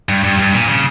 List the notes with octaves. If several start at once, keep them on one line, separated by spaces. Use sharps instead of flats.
G2
G2
G2
A#2
C#3